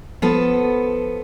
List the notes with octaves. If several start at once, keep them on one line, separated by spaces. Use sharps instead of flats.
F3 B3 A4